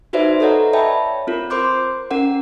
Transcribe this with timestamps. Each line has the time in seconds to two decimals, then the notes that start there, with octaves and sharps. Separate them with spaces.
0.13 D#4 F#4 B4 C5 D5 E5
0.40 A4 B4 C#5 D#5 F#5 A#5
0.73 C#5 D5 E5 G5 A5 B5
1.27 C4 F4 A#4
1.50 A#4 C5 C6 D6 G6
2.11 C#4 A#4 F#5